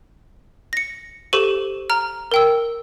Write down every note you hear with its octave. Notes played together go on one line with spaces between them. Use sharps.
A#6 C#7
G4 A4 C5 C#6 D#7
A#5 F6
A#4 G5 E6